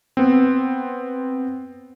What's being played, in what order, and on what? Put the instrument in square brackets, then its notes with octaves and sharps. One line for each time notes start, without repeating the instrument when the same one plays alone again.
[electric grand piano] B3 C4